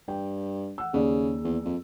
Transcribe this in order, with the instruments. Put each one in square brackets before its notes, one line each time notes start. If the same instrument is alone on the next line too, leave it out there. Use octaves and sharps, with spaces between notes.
[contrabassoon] G2 [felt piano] G5
[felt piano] F#5 E6
[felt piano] D#2 G#4 D5 [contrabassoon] C#3
[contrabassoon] E2
F2